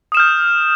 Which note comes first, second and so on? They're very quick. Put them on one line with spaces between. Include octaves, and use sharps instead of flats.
D#6 E7 F6 G6